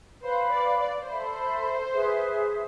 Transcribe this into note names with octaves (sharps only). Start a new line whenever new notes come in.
B4 C5 F5 B5
D5
D5
A4 C5 E5 B5
G#4 B4 E5